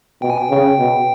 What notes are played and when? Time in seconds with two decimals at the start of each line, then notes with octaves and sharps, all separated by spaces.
0.22 B2 G5
0.30 G#5
0.38 G5
0.50 C#3
0.79 B2